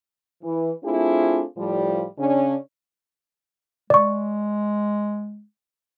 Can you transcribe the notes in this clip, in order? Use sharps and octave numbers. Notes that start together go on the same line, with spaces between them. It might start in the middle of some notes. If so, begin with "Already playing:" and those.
E3
A3 C4 D4 E4 F4 G#4
A2 F3 G3
C#3 C#4 D4
G#3 D5 C#6